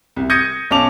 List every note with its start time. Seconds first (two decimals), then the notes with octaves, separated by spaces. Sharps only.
0.16 C2
0.30 D#6 G6 G#6 A#6 C#7 D#7
0.71 B1 C#4 A5 D6 F7